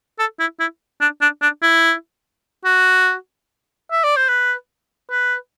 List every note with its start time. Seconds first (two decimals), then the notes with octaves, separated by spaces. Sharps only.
0.19 A4
0.39 E4
0.60 E4
1.01 D4
1.21 D4
1.42 D4
1.62 E4
2.65 F#4
3.91 E5
4.04 D5
4.16 C5
4.29 B4
5.11 B4